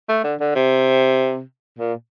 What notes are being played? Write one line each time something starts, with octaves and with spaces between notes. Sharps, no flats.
A3
D3
D3
C3
A#2